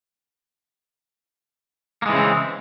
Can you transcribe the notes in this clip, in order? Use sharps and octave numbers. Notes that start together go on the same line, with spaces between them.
C#3 E3 G#3 A#3 C4